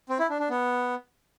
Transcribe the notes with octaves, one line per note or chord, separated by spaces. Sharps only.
C4
E4
D4
D4
B3